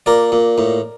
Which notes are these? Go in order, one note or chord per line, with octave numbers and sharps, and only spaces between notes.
A#2 A#4 D5
A#2
A2